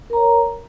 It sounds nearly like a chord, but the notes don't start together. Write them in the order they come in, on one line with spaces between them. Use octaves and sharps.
A#4 A#5 C#5